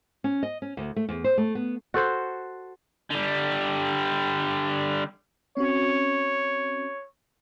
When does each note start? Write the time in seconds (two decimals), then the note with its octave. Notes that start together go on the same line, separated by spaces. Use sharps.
0.24 C#4
0.43 D#5
0.62 C#4
0.77 D2
0.96 A3
1.09 E2
1.24 C5
1.38 A3
1.55 B3
1.94 F#4 A4 C5
3.10 D3 G3
5.57 C4 C#4 F#4 C#5